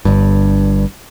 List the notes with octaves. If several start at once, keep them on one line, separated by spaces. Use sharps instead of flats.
G1 G2